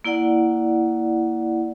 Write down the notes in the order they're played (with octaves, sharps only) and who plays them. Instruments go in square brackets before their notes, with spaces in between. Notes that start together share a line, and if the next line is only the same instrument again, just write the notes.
[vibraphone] A#3 E4 D5 F#5